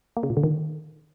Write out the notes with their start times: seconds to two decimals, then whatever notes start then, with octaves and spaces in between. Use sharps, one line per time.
0.17 A#3
0.23 C#3
0.30 A#2
0.37 D3
0.43 D#3